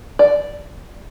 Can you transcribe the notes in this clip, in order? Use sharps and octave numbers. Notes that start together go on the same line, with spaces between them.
D5